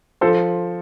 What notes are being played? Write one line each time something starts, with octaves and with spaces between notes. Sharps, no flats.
F3 A4 C5